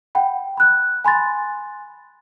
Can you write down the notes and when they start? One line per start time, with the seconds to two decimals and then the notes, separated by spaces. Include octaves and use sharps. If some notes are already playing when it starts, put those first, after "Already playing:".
0.15 F#5 G5 B5
0.57 B5 F#6
1.05 G#5 B5 C6 A6